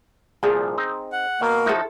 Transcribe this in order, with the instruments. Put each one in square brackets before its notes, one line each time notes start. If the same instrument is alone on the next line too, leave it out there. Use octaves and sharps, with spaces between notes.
[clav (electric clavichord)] C2 A#2 F3 [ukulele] G#4
[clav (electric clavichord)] C4 D#4
[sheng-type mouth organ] F#5
[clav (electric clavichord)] B2 [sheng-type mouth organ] A#3 A#4
[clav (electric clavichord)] F3 D#4 F#4 [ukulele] E4 A4